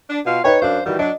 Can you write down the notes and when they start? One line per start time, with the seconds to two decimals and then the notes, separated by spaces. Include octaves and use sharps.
0.10 D4
0.26 B2 F4 F5
0.44 D#4 B4 C#5 G5
0.62 F#2 D4 C5 F5
0.86 D#3 E3 G3 F#4
0.99 F#3 D4 D#5